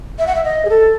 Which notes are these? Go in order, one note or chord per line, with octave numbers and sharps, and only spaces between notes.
E5
F#5
E5
D#5
G#4
A4